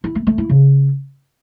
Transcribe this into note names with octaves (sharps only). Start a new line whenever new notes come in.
E4
A3
A3
E4
C#3